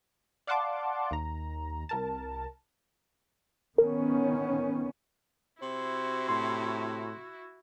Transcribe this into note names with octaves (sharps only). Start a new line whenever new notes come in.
D5 F5 F#5 A5 C6 D6
D#2 A#5
C2 A#4 A5
D#3 B3 C#4 A#4
C3 E4 F#4 C5
A2 C6